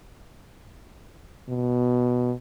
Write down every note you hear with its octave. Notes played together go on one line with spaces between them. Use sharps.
B2